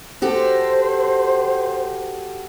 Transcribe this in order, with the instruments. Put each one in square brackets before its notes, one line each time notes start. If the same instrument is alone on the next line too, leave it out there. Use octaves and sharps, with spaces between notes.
[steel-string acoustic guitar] F#4 G4 A4 [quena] C5